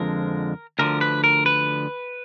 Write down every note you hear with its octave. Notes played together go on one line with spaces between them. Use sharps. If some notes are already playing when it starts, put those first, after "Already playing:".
Already playing: F2 D3 F3 G#3 A#4
D2 D3 F3 A#4
B4
A#4
B4